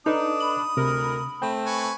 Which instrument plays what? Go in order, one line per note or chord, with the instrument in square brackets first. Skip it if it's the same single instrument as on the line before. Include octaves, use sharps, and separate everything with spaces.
[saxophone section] D4 [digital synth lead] D#4 [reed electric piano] A4 B4 D#5 [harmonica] D#6
[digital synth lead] B5
[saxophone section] D2 A#4 [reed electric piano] C3
[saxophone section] A3 C4 [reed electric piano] G5
[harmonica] B4 G#5 C#6